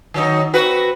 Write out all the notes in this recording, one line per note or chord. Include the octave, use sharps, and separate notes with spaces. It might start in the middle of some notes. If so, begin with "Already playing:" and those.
D#3 F#3 D#4
C4 F#4 B4